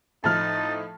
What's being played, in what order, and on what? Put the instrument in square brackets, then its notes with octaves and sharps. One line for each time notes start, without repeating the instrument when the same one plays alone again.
[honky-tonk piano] A2 F3 A3 [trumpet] D#4 [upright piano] A5 F6 [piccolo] A6